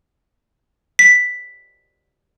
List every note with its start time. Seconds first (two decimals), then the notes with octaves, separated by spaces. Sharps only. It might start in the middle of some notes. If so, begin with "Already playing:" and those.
0.99 B6